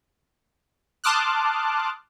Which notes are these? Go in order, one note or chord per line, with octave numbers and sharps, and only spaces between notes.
A5 C6 D6 D#6 F6 F#6